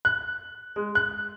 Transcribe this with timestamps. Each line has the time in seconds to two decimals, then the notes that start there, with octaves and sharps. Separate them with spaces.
0.05 F#6
0.76 G#3
0.95 F#6